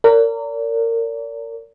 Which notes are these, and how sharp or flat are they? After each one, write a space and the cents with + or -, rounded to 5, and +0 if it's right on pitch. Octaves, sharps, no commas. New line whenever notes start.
A#4 -25 D5 -40